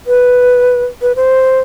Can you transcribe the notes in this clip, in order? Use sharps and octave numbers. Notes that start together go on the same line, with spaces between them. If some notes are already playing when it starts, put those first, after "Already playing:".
B4
B4
C5